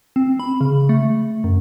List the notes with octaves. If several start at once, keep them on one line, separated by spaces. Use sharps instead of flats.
C4
B5
C#3
A3
F#2